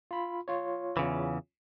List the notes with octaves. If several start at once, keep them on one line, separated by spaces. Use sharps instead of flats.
F4 B5
F4 C#5
E2 C#3 E3